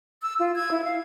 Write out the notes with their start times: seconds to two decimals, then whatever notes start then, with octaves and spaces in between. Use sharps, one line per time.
0.22 E6
0.39 F4
0.56 E6 G#6
0.72 E4
0.84 F5